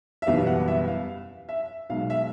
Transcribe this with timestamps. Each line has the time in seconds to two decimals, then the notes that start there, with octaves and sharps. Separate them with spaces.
0.22 E5
0.27 F#1 E2 B2 G3 B3 F5
0.47 F#5
0.68 E5
0.88 F5
1.49 E5
1.90 B1 B2 G#3 F5
2.10 E5